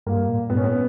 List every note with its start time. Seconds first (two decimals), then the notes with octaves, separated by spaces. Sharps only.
0.06 G2 A#3
0.29 A#2
0.50 G2 B3
0.57 A#2 C#4
0.64 B3